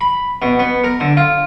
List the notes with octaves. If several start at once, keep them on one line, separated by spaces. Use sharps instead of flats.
B5
B2
B3
A#4
D3
F4